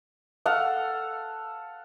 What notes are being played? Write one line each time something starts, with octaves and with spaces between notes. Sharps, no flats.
A4 F5 F#5